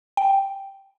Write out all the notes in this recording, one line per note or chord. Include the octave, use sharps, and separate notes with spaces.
G5